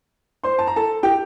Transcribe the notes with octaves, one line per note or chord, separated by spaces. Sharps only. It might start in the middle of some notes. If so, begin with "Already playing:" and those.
C5 C6
A5
A#5
A4 A5
G4 G5